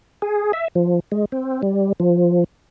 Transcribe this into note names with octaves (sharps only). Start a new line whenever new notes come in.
G#4
E5
F3
G#3
C4
G3
F3